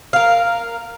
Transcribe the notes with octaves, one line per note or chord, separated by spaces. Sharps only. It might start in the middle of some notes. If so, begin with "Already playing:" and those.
A#4 F5